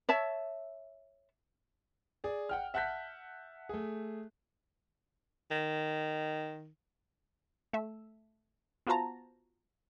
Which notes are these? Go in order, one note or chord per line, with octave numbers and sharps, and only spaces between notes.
C#5 E5 A5
G#4 D5
F#5 G5 F6
E5 F#5 A5 F#6 G6 B6
A3 G#4
D#3
A3 E5
B3 F4 F#4 C5 A5 A#5